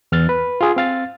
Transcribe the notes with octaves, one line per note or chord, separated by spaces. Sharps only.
E2 F6 A6
B4
F4 G#4
C4 F5 A6